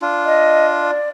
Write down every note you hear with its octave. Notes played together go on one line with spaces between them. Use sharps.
D4 F4
D#5
D5